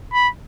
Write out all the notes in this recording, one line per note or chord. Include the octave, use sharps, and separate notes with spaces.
B5